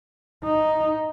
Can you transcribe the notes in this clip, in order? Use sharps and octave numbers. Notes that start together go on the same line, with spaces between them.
D#4